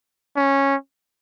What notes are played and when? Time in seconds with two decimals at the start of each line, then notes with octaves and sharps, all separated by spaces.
0.36 C#4